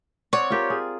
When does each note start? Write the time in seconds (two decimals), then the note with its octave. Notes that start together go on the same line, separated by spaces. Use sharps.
0.33 C4 C#5 D5 F#5
0.50 F4 G4 A#4
0.70 G#4